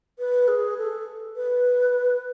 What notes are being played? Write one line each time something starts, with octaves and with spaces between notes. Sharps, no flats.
B4
G#4
A4
B4